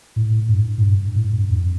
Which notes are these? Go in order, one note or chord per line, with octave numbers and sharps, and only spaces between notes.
A2
G2
A2
G2
A2
G2
F2